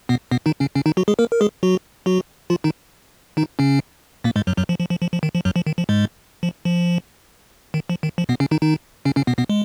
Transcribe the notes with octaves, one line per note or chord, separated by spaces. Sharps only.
B2 B3
B2 B3
D#3 D#4
C#3 C#4
C#3 C#4
D#3 D#4
F#3 F#4
G#3 G#4
A#3 A#4
A#4
G#3 G#4
F#3 F#4
F#3 F#4
F3 F4
D#3 D#4
D#3 D#4
C#3 C#4
A#2 A#3
G#2 G#3
F#2 F#3
F#2 F#3
F3
F3
F3
F3
F3
D#3
F3
F#2 F#3
F3
D#3
F3
G#2 G#3
F3
F3
D#3
F3
D#3
F3
B2 B3
C#3 C#4
D#3 D#4
D#3 D#4
C#3 C#4
C#3 C#4
B2 B3
B2 B3
G#3